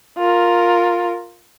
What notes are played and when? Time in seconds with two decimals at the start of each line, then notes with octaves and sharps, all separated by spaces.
0.18 F4 A#4